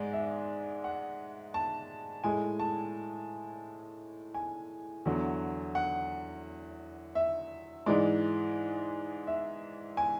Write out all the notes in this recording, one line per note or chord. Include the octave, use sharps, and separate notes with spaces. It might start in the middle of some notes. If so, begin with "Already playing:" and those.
Already playing: G#2 G#3 D5
E5
F#5
A5
A2 G#3 G#5
A5
G#5
E2 D3 F#3
F#5
E5
G#2 E3 G#3 D5
E5
G#5